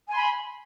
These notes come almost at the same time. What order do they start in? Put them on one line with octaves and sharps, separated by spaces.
G#5 C6 B5